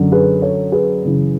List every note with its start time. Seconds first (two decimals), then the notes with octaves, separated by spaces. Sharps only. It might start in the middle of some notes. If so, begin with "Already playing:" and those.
Already playing: F#2 D3
0.12 G#4 B4
0.42 A4 C#5
0.72 G#4 B4
1.03 F#2 C#3 E3